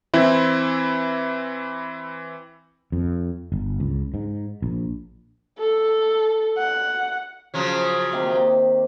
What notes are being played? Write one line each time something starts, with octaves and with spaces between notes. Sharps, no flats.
E3 C4 E4
F2
G1
C#2
G#2
A#1
A4
F#5
C#3 F3 F#3
C3 D#3 A#3